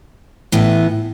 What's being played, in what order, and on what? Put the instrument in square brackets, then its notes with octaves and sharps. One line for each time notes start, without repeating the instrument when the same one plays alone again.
[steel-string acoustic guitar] A2 E3 B3